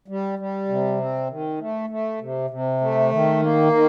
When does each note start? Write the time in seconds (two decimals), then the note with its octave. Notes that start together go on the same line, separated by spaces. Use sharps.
0.08 G3
0.39 G3
0.69 C3
0.98 C4
1.29 D#3
1.59 A3
1.90 A3
2.20 C3
2.50 C3
2.81 A3
3.11 D#3
3.42 A#3
3.72 D#3